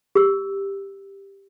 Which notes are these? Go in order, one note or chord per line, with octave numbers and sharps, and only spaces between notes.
G4 E6